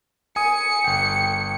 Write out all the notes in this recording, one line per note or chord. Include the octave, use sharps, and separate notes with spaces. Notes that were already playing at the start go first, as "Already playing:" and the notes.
G#5 D#6 C#7
G1 G5